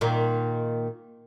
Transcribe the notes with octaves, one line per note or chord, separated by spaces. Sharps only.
A#2 D#3